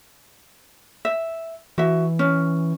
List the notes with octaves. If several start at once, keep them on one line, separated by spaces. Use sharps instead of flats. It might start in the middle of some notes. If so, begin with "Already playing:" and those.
E5
E3 F#4 E5
C#4